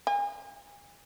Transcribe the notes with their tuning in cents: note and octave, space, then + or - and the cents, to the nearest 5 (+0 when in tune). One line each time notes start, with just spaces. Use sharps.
G#5 -35